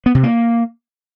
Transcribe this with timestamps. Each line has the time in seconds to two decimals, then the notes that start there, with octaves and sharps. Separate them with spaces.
0.06 B3
0.15 C3
0.23 A#3